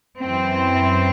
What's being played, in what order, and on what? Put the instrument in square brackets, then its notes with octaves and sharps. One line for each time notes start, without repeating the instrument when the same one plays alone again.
[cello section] F#2 E3 C4